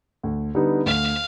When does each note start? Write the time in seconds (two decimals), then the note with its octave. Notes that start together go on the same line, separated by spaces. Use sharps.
0.23 D2
0.55 D3 G3 B3 D#4
0.86 D2 F5